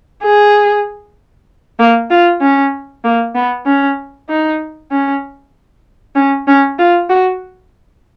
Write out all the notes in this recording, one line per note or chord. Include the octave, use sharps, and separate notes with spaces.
G#4
A#3
F4
C#4
A#3
B3
C#4
D#4
C#4
C#4
C#4
F4
F#4